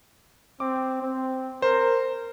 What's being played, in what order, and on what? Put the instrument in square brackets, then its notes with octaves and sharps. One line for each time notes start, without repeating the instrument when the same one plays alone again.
[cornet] C4 [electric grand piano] D6
[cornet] C4
[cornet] A#4 [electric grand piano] C5